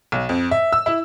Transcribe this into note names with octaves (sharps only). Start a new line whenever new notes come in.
B1
F2
E5
E6
E4